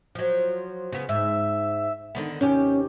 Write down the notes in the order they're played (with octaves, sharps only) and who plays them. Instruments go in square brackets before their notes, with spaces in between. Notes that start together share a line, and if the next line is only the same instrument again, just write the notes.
[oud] F3 F#3
C#3 B3
[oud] G#2 [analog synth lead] E5
[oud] D3 D#3 B3
[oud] D#2 C3 G4 [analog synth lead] C#4